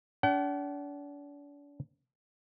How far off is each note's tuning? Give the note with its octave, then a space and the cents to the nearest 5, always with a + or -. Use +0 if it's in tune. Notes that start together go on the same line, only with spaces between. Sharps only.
D4 -40 F#5 +40